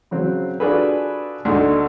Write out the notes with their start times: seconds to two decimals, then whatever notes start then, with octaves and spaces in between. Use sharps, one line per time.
0.11 C#3 F#3 C4
0.60 D4 F4 F#4 G#4 A4 B4
1.45 D2 A3 D4 D#4 A4